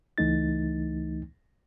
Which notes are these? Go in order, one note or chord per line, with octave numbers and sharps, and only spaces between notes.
C#2 E3 A3 D#4 A6